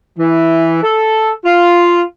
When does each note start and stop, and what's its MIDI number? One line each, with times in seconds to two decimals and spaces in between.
0.19 0.82 52
0.83 1.30 69
1.45 2.01 65